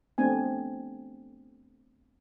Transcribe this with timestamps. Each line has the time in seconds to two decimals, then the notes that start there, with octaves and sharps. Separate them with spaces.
0.18 A3 B3 C4 D4 G#5